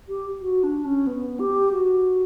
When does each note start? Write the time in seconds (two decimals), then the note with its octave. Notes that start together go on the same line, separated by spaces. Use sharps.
0.09 G4
0.41 F#4
0.63 D4
0.85 C#4
1.07 B3
1.39 G4
1.72 F#4